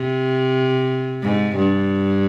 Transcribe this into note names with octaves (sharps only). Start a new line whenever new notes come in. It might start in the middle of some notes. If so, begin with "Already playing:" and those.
Already playing: C3
G#2
G2